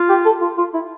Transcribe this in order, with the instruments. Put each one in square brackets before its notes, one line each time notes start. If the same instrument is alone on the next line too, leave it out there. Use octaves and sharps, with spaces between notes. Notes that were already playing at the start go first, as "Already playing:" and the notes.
Already playing: [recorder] F4
[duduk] G4
A4
F4
F4
E4